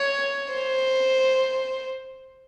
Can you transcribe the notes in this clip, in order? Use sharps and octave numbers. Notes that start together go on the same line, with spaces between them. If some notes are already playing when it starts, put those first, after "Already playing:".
Already playing: C#5
C5